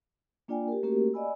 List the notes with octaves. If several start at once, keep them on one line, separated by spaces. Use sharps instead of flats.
A#3 D4 F4 D5 G5 G#5
G4 A#4
A3 A#3 C#4 F#4 G4 A#4
D5 D#5 F5 G#5 B5 E6